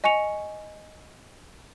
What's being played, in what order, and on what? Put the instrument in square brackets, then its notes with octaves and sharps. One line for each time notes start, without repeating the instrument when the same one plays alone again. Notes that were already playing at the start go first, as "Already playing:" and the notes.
[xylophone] D#5 G#5 C#6 C#7 F7